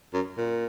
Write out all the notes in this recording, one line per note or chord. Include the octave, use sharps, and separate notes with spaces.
F#2
A#2